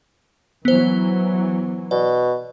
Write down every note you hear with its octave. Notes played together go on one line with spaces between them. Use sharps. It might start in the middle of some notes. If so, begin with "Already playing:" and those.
E3 F#3 B3 C5
B2 D5